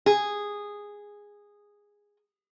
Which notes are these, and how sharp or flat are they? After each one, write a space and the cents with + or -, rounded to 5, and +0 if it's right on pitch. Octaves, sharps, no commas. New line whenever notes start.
G#4 -10